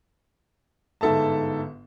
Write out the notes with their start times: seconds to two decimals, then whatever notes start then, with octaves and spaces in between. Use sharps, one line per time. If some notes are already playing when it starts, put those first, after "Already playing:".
1.01 G1 G#2 A4 E5 A5